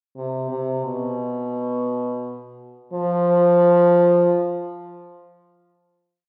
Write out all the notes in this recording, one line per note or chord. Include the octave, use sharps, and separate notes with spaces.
C3
C3
B2
F3